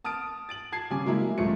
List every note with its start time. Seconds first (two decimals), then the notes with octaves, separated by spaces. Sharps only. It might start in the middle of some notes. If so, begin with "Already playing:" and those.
0.04 A5 D#6 F6 A6 D7
0.49 A6 D7 F#7
0.72 A5 G#6 C7
0.90 C#3 G3 G#5 D6
1.05 F#3 G#3 A#3 E4
1.38 D#1 F#2 F3 G#3 A3 C#7